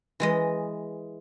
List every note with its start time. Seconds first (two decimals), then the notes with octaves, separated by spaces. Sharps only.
0.20 E3 G#3 D#5